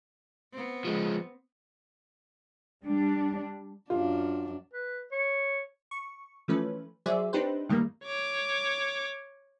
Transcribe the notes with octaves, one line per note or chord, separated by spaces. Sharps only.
B3 C4
F3 G#3
G3 D4
F#2 D4 F4
B4
C#5
C#6
E3 F3 A3 C#4 B4
F#3 G#4 C5 D5 E5
C4 D4 D#4 G4 B4 C5
G2 D#3 G3 A3 A#3
C#5 D6